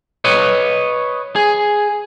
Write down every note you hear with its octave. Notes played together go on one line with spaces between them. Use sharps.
B4 C#5 D#5
G#4